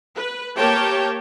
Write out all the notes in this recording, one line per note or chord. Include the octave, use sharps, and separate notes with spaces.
B4
A#3 G4 A#4 C#5 G5 A5